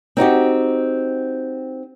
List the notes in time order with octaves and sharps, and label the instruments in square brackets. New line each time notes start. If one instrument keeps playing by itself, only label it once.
[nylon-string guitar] C4 D#4 F#4 G4